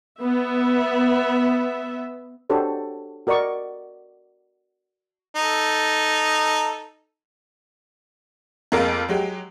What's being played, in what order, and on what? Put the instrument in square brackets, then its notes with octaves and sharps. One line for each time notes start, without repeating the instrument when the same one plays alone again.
[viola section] B3 E5
[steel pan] D4 F#4 G4 A4 C5 C#5
F#4 A#4 D5 D#5 C#6
[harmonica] D#4 A4
[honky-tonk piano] F2 G#3 A#3 A#4 F5
F#3 G#3 G4